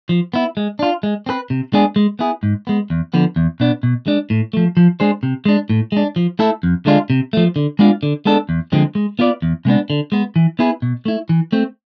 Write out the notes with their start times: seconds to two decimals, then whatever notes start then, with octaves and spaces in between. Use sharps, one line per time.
0.09 F3
0.34 B3 E4
0.57 G#3
0.79 D4 F4
1.03 G#3
1.26 C4 G#4 B4
1.50 C3
1.73 G#3 B3 D4 G#4
1.96 G#3
2.19 B3 E4 G#4
2.43 G#2
2.67 G#3 B3
2.90 E2
3.14 D3 F3 B3
3.36 E2
3.60 B2 B3 D4
3.83 B2
4.07 G#3 D4
4.30 A2
4.53 F3 A3
4.77 F3
5.00 G#3 D4 G#4 C5
5.23 C3
5.45 G#3 D4
5.70 A2
5.92 G#3 D4
6.16 F3
6.39 A3 E4 A4
6.63 F2
6.86 D3 G#3 D4 F4
7.10 C3
7.33 F3 A3
7.56 D3
7.79 G#3 B3 D4 F4
8.03 D3
8.25 G#3 B3 D4 A4
8.49 E2
8.72 D3 F3 G#3 C4
8.95 G#3
9.19 B3 F4 B4 D5
9.42 E2
9.65 C3 G#3 B3 D4
9.90 D3
10.12 G#3 B3
10.36 E3
10.59 B3 E4 G#4 B4
10.82 B2
11.05 A3 E4
11.29 E3
11.52 A3 C4